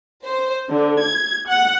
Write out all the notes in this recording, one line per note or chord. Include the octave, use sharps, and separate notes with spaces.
C5
D3
G#6
F#5